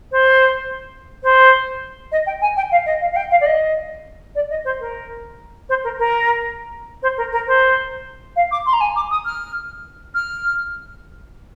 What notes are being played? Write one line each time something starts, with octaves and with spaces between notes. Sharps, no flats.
C5
C5
D#5
G5
G#5
G5
F5
D#5
F5
F5
G5
F5
D5
D#5
D5
D#5
C5
A#4
C5
A#4
A#4
C5
A#4
A#4
C5
F5
D6
C6
A#5
G#5
D6
D#6
F6
F6